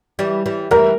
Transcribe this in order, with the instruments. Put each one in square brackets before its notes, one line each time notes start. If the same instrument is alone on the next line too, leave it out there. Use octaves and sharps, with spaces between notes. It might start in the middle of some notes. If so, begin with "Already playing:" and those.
[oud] E3 G3
E3 G3
[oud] E3 G3 [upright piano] A#4